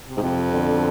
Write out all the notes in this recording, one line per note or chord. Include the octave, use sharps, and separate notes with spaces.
C3
G#2
F2
B2 D3